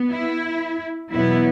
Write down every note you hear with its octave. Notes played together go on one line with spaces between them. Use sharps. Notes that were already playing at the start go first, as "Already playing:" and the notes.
Already playing: B3
E4
E2 B2 F#3 B3 E4